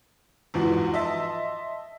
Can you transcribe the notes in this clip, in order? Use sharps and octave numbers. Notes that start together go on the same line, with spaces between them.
E2 G#2 F3 F#4
D#5 E5 A5 C6